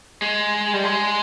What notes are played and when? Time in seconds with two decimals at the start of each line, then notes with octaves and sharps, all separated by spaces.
0.22 G#3
0.73 G3
0.84 G#3